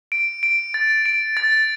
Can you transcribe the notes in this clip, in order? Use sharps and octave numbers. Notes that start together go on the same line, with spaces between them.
D7
D7
A6
D7
A6